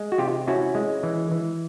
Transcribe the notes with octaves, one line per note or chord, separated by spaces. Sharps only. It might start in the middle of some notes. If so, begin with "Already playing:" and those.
Already playing: G#3
F#4
C3 F4 G4
C#4 E4 F#4
G#3
E3
E3